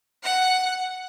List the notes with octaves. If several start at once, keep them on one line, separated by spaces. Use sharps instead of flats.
F#5